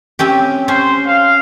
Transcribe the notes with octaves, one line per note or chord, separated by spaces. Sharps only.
C4 C#4 G4
C#4 C5
F5